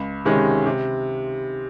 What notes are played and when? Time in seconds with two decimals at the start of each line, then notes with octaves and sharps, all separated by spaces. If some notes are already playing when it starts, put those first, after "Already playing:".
Already playing: C#2
0.25 C3 D#3 G#3 C#4
0.66 C3